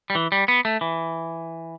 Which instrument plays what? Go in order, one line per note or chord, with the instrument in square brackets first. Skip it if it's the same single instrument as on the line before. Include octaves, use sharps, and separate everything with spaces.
[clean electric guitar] G3
E3
G3
B3
A3
E3